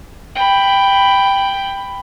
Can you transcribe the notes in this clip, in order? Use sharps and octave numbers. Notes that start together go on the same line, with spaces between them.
G5 B5